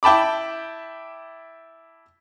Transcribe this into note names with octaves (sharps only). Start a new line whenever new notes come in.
E4 G5 A5 B5 D6